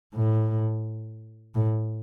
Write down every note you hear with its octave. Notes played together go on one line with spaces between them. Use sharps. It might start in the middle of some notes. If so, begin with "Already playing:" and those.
A2
A2